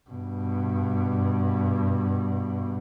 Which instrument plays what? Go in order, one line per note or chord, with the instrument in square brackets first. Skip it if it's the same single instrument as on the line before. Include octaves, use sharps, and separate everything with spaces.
[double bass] G2 B2